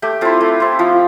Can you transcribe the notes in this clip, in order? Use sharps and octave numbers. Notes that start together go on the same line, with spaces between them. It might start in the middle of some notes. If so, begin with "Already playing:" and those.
A3 G4
C4 E4 F4 A4
A3
C4 E4
F3 F4